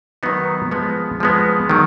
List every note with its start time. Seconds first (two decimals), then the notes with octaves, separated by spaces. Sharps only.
0.23 D#3 F#3 B3 D#4
0.71 F3 G#3 B3
1.20 F3 G#3 B3
1.70 D#3 F#3